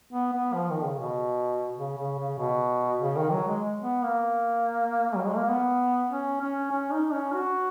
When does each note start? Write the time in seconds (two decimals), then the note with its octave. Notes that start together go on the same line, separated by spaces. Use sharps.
0.13 B3
0.33 B3
0.54 F3
0.70 D#3
0.85 C#3
1.00 B2
1.78 C#3
1.98 C#3
2.19 C#3
2.39 B2
3.01 C#3
3.17 D#3
3.32 F#3
3.48 G#3
3.83 B3
4.04 A#3
5.16 F#3
5.27 G#3
5.37 A#3
5.48 B3
6.09 C#4
6.41 C#4
6.72 C#4
6.92 D#4
7.13 C#4
7.33 F#4